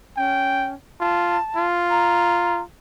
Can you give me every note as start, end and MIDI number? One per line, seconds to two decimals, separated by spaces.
0.17 0.74 61
0.17 0.72 79
1.00 1.37 65
1.00 1.66 81
1.56 2.63 65
1.90 2.62 82